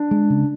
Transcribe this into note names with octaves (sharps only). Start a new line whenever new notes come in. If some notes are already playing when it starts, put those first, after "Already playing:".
Already playing: D4
G#3
C#3